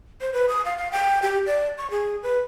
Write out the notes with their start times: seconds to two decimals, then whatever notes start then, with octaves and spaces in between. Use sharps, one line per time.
0.21 C5
0.33 B4
0.49 D#6
0.65 F5
0.77 F5
0.92 G5
1.22 G4
1.46 D5
1.78 C#6
1.90 G#4
2.23 B4